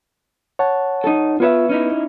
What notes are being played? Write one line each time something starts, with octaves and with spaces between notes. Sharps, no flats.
C#5 F#5 A5
D#4 A4
B3 F4 B4 C#5 E5
C#4 D#4 E4